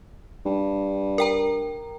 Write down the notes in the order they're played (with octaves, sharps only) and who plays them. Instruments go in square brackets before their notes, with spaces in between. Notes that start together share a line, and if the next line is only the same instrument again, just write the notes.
[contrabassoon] G2
[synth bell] A#4 G5 A#5